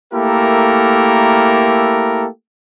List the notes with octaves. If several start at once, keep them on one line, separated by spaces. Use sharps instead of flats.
A3 A#3 E4 G4 A4 A#4